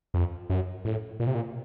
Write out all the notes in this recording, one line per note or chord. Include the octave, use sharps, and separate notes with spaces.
F2
F#2
A2
A#2
C3
A#2